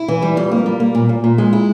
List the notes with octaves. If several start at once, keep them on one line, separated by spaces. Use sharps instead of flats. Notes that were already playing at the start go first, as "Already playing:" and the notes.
Already playing: E4
E3
G3
F2
A#3
G3
A#3
A#2
A#2
A#2
G#3
E4